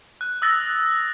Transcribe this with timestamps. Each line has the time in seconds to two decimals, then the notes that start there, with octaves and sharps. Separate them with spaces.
0.21 F#6
0.42 D#6 E6 F#6 A6 A#6